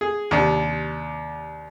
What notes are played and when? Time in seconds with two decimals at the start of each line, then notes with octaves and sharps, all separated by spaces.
0.01 G#4
0.31 D#2 C3 D4